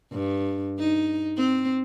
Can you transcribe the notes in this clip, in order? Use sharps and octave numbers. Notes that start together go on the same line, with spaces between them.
G2
D#4
C4